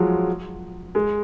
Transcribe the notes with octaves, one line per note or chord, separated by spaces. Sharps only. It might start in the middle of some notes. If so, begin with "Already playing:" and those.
Already playing: F3 F#3 G#3
G#3